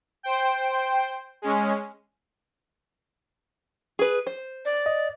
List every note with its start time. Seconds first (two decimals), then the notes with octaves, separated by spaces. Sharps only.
0.23 C5 G5
1.42 G#3 C#4
3.99 G#4 B4
4.27 C5
4.65 D5
4.86 D#5